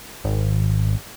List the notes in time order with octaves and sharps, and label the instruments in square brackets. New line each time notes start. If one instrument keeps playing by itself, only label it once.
[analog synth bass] G#1